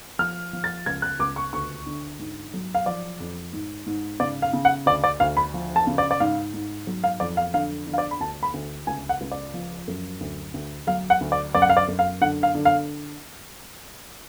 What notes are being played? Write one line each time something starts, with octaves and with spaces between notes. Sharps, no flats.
F3 F6
F3
A6
C#2 G#6
F#6
C#2 D6
C#6
D2 C#6
D3
G#2
F#3
F5
F3 D5
F2
G#2
G#2
C#3 D5
F5
C#3
F#5
D2 D5
D5
D2 F5
B5
F3
A5
C#3
D5
D5
G#2 F5
G#2
F#3
F5
F2 D5
F5
D3 F5
D3
F5
D5
B5
D2 A5
B5
D2
C#2 G#5
F#5
C#2
D5
F3
F#2
D2
D2
F#3 F5
F#5
D2
D5
F#2 D5
F#5
F5
D5
F#2
F5
D3 F#5
F5
D3
F5